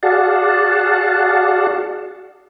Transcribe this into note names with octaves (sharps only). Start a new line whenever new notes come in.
F#4 G#4 D5 F5 F#5 A5